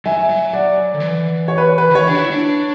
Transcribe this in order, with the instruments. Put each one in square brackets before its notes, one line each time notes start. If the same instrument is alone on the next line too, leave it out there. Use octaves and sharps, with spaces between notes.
[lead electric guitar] F#3 [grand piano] E5 G#5
[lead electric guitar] F#3
[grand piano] D5 F#5
[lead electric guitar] D3
E3
[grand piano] C#5
B4
B4
[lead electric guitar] D3
[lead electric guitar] E3 [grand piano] C#5
[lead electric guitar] D4
F#4
E4
D4